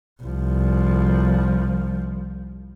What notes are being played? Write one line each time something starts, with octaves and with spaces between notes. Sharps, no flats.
C2 F3